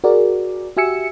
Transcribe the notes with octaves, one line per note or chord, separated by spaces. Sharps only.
F#4 G#4 A#4 D5
F#4 G4 E5 G#5 E6 C#7